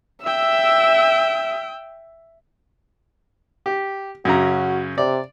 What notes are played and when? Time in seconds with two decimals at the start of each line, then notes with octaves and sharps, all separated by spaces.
0.25 E5 G5 E6
3.66 G4
4.25 F#2 C#3 F#4 A#5
4.98 C3 D5